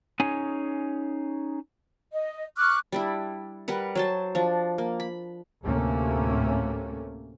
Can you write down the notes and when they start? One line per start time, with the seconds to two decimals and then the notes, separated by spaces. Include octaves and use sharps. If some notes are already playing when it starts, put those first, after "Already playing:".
0.20 C#4 D#4 G#4 C#5 G#5
2.13 D#5
2.57 C#6 D6 F6 F#6
2.92 G3 D4 E4
3.68 G3 A#4 B4 F#5
3.95 F#3 C5 A5
4.35 F3 D4
4.78 A#3
5.00 B5
5.62 D2 A2 C3 A3 A#3 C#4